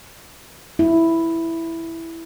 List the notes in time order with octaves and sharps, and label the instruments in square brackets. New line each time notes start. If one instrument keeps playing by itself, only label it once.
[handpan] E4